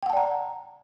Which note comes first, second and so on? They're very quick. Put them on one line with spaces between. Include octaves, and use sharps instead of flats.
G5 F#5 A5 D5 A#5